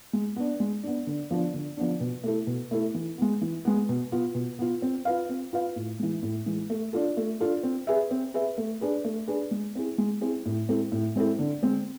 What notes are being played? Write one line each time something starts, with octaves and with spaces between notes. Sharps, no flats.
G#3
B3 D4
G#3
B3 D4
D3
F3 B3 D4
D3
F3 B3 D4
B2
A3 E4 A4
B2
A3 E4 A4
E3
G#3 B3
E3
G#3 B3
B2
B3 F4
B2
B3 F4
C4
F4 B4 F5
C4
F4 B4 F5
A2
E3 G#3
A2
E3 G#3
A3
D4 F4 A4
A3
D4 F4 A4
C4
G#4 B4 E5
C4
G#4 B4 E5
A3
D4 G#4 B4
A3
D4 G#4 B4
G#3
C4 E4 G#4
G#3
C4 E4 G#4
A2
G#3 C4 E4 A4
A2
G#3 C4 E4 A4
D3
G#3 C4